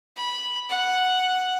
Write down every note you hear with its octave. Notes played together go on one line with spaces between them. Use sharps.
B5
F#5